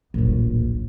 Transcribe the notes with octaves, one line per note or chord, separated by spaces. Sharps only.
D1 A#1